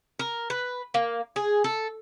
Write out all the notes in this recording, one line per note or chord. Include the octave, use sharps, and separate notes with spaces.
A#4
B4
A#3
G#4
A4